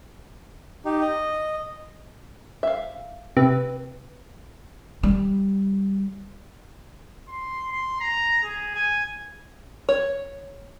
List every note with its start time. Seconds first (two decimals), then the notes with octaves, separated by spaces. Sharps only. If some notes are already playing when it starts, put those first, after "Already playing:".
0.85 D#4 G4
1.01 D#5
2.63 E5 F5
3.37 C3 B4
5.03 G3
7.29 C6
7.72 C6
8.01 A#5
8.43 G#4
8.74 G#5
9.89 C#5